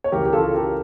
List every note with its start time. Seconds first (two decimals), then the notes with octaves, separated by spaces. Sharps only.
0.04 C#5
0.12 C#2 C#3 E3 G4 A#4
0.25 G4
0.33 F4 A4
0.54 G4 A#4